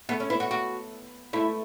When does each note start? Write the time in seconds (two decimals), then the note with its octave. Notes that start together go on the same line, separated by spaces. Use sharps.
0.09 A3 B3 A4
0.20 C#4
0.30 B3 E4 B4
0.40 F#4
0.51 F#4
1.33 A3 E4 A4